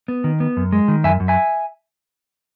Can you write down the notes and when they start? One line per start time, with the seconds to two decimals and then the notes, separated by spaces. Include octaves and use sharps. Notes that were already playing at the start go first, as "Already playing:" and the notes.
0.08 B3
0.24 D#3
0.40 B3
0.57 F#2
0.72 G#3
0.88 D#3
1.04 F#2 E5 G#5
1.20 F#2
1.28 E5 G#5